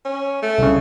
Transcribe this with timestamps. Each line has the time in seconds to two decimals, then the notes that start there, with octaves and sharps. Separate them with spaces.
0.05 C#4
0.43 A3
0.58 C2 C#3